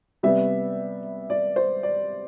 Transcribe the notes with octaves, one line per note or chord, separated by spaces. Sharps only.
C3 G3 B3 E5
D5
C5
D5